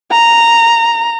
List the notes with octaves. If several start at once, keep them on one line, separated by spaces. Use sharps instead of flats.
A#5